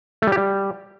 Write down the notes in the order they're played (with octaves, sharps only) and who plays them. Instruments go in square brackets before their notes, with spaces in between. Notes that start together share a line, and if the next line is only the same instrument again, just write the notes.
[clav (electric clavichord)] A3
G3
G4
G3